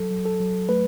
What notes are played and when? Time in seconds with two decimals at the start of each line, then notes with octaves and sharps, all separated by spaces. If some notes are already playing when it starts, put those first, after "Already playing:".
Already playing: F#3 A4
0.11 F#3
0.25 A4
0.40 F#3
0.69 A3 B4